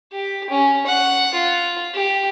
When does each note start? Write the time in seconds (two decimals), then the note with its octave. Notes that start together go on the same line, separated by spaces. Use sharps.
0.12 G4
0.50 C#4
0.87 F#5
1.34 F4
1.94 G4